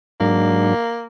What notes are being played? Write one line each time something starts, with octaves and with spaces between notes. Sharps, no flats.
G#2 F#3 A#3 D4